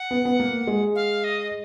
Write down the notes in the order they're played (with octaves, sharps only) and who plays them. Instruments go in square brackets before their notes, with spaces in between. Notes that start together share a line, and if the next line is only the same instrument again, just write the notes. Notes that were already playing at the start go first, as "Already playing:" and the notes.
Already playing: [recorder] F#5
[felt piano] B3
B3
A#3
G#3
[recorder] F5
D#5